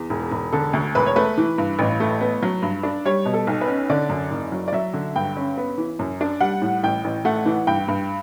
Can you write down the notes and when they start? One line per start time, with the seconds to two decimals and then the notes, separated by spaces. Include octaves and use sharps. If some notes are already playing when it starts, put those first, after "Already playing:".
Already playing: E2
0.10 E1
0.32 E1
0.53 D3 A4
0.73 D2
0.95 E1 B4
1.06 C#5
1.16 A3 B4
1.38 E3
1.58 G2
1.79 A1
2.00 A3
2.20 B3
2.43 F#3
2.62 G2
2.83 D4
3.05 G3 C#5
3.25 B2
3.34 A4
3.47 B1
3.61 B4
3.68 C#4
3.90 D3 D5
4.09 F#2
4.31 F#1
4.52 F#3
4.68 D5
4.73 F#3 E5
4.93 D3
5.16 G2 G5
5.37 C#4
5.57 B3
5.78 E3
5.99 F#2
6.21 D4
6.41 G3 F#5
6.62 A2
6.83 A1 G5
7.04 A1
7.25 A3 F#5
7.46 E3
7.67 G2 G5
7.88 G2